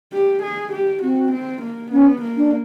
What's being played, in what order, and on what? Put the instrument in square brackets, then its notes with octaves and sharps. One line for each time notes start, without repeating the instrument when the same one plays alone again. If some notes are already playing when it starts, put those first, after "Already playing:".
[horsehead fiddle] G4
G#4
G4
[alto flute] C4 [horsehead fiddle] F#4
[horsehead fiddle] C4
A#3
[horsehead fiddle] B3 [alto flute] C#4
[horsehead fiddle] A#3
[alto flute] D4